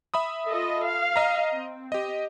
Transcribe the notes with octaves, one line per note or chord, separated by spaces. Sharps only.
E5 B5 D#6
F4 A4 D#5
F5
D#5 A#5
C4
G4 D#5